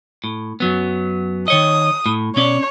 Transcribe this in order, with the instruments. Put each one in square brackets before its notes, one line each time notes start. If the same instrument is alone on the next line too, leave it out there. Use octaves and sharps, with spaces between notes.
[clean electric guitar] A2
F#2 F#3 B3
[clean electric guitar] D#3 C#5 D#5 [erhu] D#6
[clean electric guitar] A2
[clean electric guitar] B2 C#4 D5 [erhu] C#5